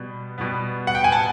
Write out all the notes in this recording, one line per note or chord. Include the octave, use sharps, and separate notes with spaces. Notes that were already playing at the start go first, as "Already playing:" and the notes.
Already playing: B2 G3 B3
B2 G3 B3
F#5
G5
G#5
A5